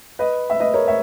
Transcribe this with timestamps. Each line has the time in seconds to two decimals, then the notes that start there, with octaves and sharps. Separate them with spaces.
0.19 B4 D#5
0.50 E5
0.60 B4 D#5
0.74 A#4 C#5
0.88 C#5 E5